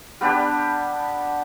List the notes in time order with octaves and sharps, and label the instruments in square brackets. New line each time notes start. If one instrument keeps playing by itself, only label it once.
[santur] G3 B3 D4 G4